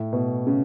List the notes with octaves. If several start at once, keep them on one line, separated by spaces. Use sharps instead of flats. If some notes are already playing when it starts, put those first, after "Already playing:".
Already playing: A2
B2
C#3